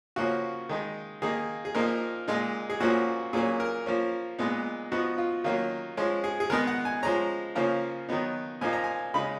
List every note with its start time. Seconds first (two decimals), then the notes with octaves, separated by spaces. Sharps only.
0.16 C#3 F3 A#3 C#4 F#4
0.69 D#3 G#3 D#4
1.22 D#3 A#3 D#4 G#4
1.65 G#4
1.75 A#2 F3 A#3 D#4 A#4
2.28 A#2 G#3 D#4
2.70 G#4
2.80 A#2 F3 A#3 C#4 F#4
3.33 A#2 F#3 A#3 C#4 G#4
3.60 A#4
3.86 F3 A#3 C#4
4.39 A#2 G#3 B3 D#4
4.92 F3 B3 D#4 F#4
5.18 F4
5.44 D#3 F#3 A#3 C#4 F4
5.97 F3 G#3 C#4
6.24 G#4
6.40 G#4
6.50 D#3 G#3 B3 D#4 A#4
6.67 F#5
6.85 G#5
7.03 F3 G#3 C#4 A#5
7.55 C#3 F3 A#3 C#4 A#5
8.09 D#3 F#3 B3 D#4
8.61 A#2 F3 A#3 D#4 G#5
8.73 A#5
8.84 G#5
9.14 C#3 G#3 D#4 B5